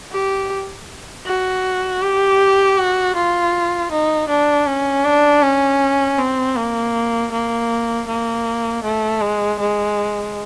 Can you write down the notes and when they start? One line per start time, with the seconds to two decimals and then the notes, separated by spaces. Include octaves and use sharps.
0.12 G4
1.26 F#4
2.02 G4
2.78 F#4
3.16 F4
3.92 D#4
4.29 D4
4.67 C#4
5.05 D4
5.43 C#4
6.19 C4
6.56 A#3
7.32 A#3
8.08 A#3
8.83 A3
9.21 G#3
9.60 G#3